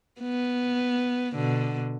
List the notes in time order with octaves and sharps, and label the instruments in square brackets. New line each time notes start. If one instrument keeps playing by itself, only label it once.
[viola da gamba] B3
B2 D3